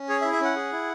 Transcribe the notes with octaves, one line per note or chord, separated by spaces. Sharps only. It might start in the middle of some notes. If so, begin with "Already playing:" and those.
Already playing: C#4
G#4 C#5
E5
E4
E5
C#4 F#5
G#4
E4